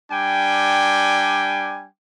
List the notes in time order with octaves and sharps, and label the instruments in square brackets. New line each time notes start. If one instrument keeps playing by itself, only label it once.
[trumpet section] G3 D4 G5 G#5